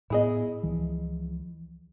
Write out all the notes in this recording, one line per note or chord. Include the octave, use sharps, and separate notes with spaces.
A2 B3 E4 G#4 D#5
C#2 E3 F3